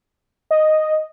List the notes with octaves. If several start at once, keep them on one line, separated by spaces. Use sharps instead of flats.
D#5